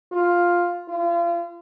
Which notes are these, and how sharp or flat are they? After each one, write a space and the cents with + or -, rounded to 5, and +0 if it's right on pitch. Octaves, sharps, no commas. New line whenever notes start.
F4 +5
F4 -35